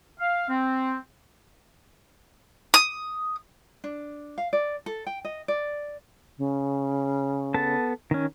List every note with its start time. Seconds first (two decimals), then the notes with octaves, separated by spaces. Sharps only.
0.19 F5
0.49 C4
2.74 D#6
3.84 D4
4.38 F5
4.53 D5
4.86 A4
5.07 G5
5.25 D#5
5.48 D5
6.38 C#3
7.54 B3 A4 A5
8.11 D#3 C#4